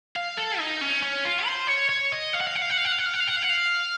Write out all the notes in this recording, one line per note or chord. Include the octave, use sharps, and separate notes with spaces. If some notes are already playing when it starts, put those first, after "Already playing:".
F5
A4
D#4
C#4
C#4
F4
C5
C#5
C#5
D#5
F5
F#5
F5
F#5
F5
F#5
F5
F#5
F5
F#5
F5
F#5
F5
F#5
F5
F#5
F5